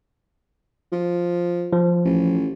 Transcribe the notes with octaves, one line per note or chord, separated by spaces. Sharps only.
F3
F3
A1